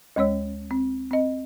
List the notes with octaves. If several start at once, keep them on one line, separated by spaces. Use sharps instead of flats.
D2 G#3 C#4 C#5 E6
C4
C4 D#5